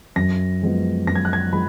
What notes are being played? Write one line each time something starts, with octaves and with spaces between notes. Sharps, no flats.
F#2 A#6
F3 G#3 B3
F#2 A#6
G#6
F#6
G#6
F3 G#3 B5